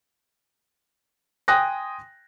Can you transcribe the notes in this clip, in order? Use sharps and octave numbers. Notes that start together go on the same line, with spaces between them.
G5 G#5 C6 D#6 F#6 A#6